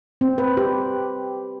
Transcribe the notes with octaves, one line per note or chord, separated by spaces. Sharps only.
C4
B4
G4